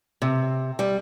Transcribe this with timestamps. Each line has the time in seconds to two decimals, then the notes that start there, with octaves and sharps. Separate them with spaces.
0.22 C3
0.79 G3